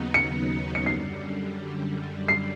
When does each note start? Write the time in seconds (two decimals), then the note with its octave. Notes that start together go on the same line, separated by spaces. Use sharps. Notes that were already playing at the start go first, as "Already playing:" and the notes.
Already playing: D#2 C#3 F#3 B3 D#4
0.14 C#7
0.75 C#7
0.86 F#2 D3 G3 C7
2.28 C7